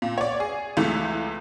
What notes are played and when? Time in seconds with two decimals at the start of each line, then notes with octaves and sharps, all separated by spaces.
0.02 A#2
0.18 C#5 D5
0.40 G#4
0.77 C#2 E3 A3